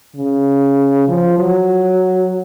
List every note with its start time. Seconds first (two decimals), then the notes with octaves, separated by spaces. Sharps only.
0.16 C#3
1.08 F3
1.39 F#3